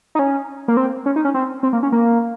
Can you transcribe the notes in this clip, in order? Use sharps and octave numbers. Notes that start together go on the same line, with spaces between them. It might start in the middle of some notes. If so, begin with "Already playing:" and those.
D#4
C#4
A#3
C4
C#4
D#4
C#4
C4
C4
A#3
C#4
A#3